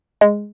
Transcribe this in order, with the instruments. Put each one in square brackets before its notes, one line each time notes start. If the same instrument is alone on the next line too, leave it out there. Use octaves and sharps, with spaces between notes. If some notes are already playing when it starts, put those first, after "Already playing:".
[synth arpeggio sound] G#3